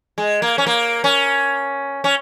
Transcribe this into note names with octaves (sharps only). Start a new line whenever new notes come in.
G#3
A#3
C#4
A#3
C#4
C#4